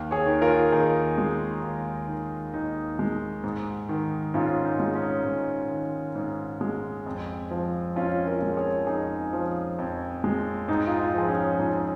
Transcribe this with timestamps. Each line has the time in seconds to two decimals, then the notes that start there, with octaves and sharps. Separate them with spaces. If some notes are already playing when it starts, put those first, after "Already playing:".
Already playing: D#2
0.11 G#4 C#5
0.26 D#3
0.41 F4 A#4
0.72 D#2 D#4 G#4
1.18 G#3
1.62 D#2
2.08 D#3
2.53 D#2 D#4
2.99 G#3
3.44 G#2
3.89 D#3
4.34 G#2 C#4 F4
4.65 D#4
4.80 G#3
4.95 C#4
5.24 G#2 D#4
5.70 D#3
6.15 G#2
6.61 G#3
7.06 F2
7.51 F3
7.96 F2 C#4 F4
8.27 F4 A#4
8.42 G#3
8.57 G#4 C#5
8.87 F2 D#4 G#4
9.33 F3
9.79 F2
10.24 G#3
10.68 G#2 D#4
10.87 F4
10.99 D#4
11.14 F3 G#4
11.28 C#4 F4
11.59 G#2 C#4 F4